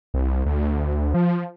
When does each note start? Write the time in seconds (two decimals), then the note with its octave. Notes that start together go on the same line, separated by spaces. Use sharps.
0.14 C2
0.46 D2
1.14 F3